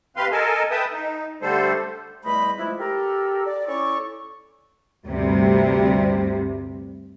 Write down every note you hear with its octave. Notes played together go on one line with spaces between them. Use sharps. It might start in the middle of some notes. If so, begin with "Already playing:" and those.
C3 C4 B4 F5 C6
A4 A#4 D#5 G#5 A5
B4 E5 G5 A5 D#6
D#4
D3 G3 A3 A4 C5
E2 G3 A3 C5 D#5 B5
F3 G#3 A3 D4 E4
G4 A4 A#4
D5
C#4 E4 A4 D5 C#6
D2 G2 C3 G3